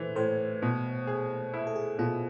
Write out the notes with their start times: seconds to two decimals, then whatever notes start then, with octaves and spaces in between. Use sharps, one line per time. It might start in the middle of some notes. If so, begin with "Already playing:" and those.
Already playing: E3 A4 B4 C5
0.16 A2 C5
0.62 B2
1.07 G#4
1.54 E4
1.67 A4
1.76 G#4
1.99 B2 F4